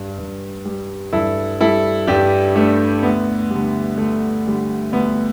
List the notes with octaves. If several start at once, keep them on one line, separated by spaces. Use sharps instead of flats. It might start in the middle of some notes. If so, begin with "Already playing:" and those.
Already playing: G2 G3
G2
G3
G2 E4 A4
G3 E4 A4
G2 D4 G4
G3 A3 D4
D2 B3
D3 G3
D2 A3
D3 G3
D2 B3